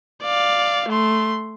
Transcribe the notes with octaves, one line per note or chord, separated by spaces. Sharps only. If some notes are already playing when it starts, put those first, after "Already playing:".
D5 F5
A3 C6